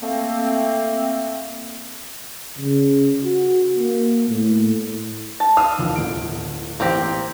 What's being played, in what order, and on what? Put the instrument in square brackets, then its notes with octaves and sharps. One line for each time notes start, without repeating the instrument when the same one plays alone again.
[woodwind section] A3 A#3 C4
[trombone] C#3
F#4
A#3
A2
[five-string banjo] A5
[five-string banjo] F5 [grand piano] D#6 E6
[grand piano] A1 D#2 F3
D1 G1 D7
[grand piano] A1 [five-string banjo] A#3 C4 G4